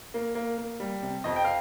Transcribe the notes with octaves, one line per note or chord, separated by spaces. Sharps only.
A#3
A#3
A#3
G3
C3
F2 D#5
G5
F5